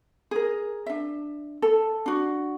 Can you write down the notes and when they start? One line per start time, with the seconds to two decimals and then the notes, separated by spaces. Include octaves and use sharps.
0.31 G#4 A#4
0.86 D4 E5
1.62 A4
2.06 D4 F#4